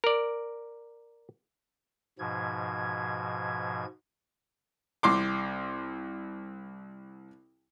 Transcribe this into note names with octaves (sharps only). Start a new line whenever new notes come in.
A#4 D5
G#2 B2 F3 G#6
C2 C6 D6